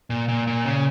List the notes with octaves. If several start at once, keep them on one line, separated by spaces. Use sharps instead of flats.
A#2
A#2
A#2
C#3